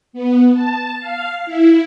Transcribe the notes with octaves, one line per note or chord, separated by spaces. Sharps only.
B3
A5
F5
E4